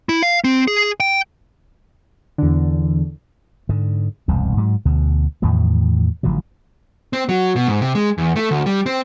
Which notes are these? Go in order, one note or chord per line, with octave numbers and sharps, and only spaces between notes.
E4
F5
C4
G#4
G5
E2 D3
G#2 D3
E1 C2 F#2
G#2 F#3
D2 B2
E2 A2 D#3 F3
A1 D3 F3 F#3
C4
F#3
B2
G#2
C3
G#3
E2
A3
D2
G3
C4